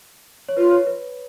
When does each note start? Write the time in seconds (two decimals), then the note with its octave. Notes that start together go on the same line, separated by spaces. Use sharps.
0.49 C#5
0.57 F4 B4
0.72 C#5
0.87 B4